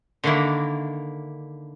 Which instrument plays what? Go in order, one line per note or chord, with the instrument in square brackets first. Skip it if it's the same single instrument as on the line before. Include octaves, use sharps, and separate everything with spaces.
[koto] D3 D#3 A#3 D4 E4 D5